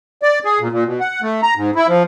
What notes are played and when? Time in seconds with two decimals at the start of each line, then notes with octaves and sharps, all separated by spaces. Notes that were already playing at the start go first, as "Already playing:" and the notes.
0.22 D5
0.45 G#4
0.60 A#2
0.72 A#2
0.86 B2
1.00 F#5
1.22 A3
1.43 A#5
1.56 G#2
1.75 E4
1.88 F3